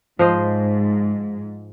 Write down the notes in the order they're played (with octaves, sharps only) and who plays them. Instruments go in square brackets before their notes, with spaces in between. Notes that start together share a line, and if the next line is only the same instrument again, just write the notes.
[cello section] G#2 [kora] F3 C5 D#5